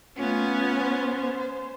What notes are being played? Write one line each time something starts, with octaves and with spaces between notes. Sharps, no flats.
A3 B3 C#4 F4
C5